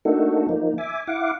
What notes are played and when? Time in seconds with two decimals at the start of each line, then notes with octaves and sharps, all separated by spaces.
0.05 A3 A#3 D4 D#4 F#4 A4
0.49 F3 A#3 D#4
0.78 E5 G#5 D6
1.07 E4 F5 F#5 D6